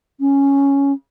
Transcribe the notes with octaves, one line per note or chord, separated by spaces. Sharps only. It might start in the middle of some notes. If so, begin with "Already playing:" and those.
C#4